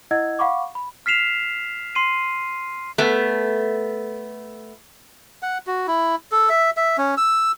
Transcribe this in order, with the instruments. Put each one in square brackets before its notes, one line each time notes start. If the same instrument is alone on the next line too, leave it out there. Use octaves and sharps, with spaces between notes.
[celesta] E4 D#5 F#5 E6 G#6
F5 F#5 B5 C#6 D6
B5
[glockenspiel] F6 B6 C7 E7 F7
C6 C7 D#7
[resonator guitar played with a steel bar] A3 B3
[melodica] F#5
F#4
E4
A4
E5
E5
C#4
E6